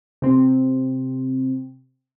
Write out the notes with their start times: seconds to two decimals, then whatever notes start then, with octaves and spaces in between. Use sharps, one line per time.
0.22 C3 C4